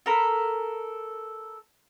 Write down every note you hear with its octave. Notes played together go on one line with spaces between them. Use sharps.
A4 A#4 B5